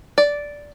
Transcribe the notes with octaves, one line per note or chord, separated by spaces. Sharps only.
D5